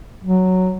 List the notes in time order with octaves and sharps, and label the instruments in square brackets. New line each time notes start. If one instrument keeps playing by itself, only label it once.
[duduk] F#3